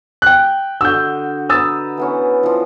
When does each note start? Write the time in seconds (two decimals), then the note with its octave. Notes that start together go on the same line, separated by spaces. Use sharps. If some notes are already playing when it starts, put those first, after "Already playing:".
0.22 G5 F#6
0.81 D3 F#4 D#5 E6 G6
1.49 B4 A#5 D#6 E6 A6
1.97 E3 B3 C#4
2.43 E3 F3